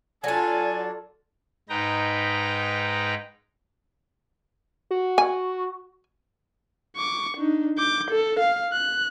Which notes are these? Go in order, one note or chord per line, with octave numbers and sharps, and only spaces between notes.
F#3 D4 F4 A4 D5 G#5
G#2 D#4 B4 G5 A#5
F#4
G#5
C#6 D6
D4 D#4
D6 G6
A4
F5
F#6